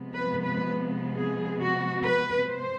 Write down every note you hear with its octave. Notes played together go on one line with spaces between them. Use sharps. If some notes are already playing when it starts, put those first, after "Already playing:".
Already playing: C3 F3 G#3 B3
B4
B4
G#4
F#4
B4
C5